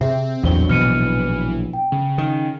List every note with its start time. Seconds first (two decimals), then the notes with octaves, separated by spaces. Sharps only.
0.01 C3 C4 G#4 E5
0.43 A#1 E2 A2 F#3 D4 C5 G7
0.69 B2 E3 F6 C#7 D#7
1.73 G5
1.92 C#3
2.18 D#3